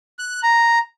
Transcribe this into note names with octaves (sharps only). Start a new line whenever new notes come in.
F#6
A#5